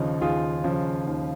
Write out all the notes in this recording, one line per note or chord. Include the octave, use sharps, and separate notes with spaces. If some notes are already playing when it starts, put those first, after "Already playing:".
Already playing: D#2 C#3 F3 D#4
D#2 F4 G#4
C#3 F3
D#2